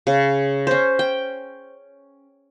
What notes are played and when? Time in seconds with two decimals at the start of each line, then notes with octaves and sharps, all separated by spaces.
0.07 C#3
0.67 C#4 C5
0.99 G5